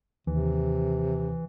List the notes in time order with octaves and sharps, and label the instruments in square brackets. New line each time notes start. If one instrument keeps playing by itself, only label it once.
[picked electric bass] D#2 [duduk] C3 [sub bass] E3